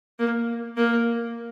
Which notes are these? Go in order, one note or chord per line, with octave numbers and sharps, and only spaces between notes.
A#3
A#3